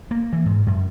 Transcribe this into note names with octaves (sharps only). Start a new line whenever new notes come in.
A#3
E3
G#2
F#2